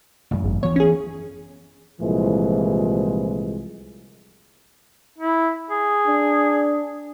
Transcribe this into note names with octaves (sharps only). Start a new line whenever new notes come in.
A1 F#2
G#1
D2 E3 B3 C#5
C#4 G#4
C2 A#2 E3 F3 G#3
E4
G#4
D4